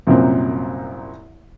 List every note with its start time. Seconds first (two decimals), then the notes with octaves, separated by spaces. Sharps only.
0.07 C2 F#2 A#2 C4